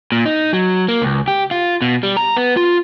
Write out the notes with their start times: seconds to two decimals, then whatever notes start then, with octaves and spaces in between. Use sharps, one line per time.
0.12 A#2
0.26 D#4
0.53 F#3
0.88 A#3
1.02 C#2
1.28 G4
1.51 F4
1.82 B2
2.03 G3
2.17 A#5
2.37 B3
2.57 F4